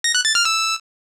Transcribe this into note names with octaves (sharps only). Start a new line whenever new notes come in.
A#6
F#6
A6
F6
E6